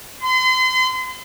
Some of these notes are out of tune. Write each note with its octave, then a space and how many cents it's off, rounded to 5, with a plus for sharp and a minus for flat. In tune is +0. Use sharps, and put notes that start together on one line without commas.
C6 -40